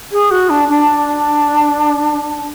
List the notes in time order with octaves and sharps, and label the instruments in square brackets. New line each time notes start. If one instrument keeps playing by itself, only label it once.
[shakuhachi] G#4
F#4
D4
D4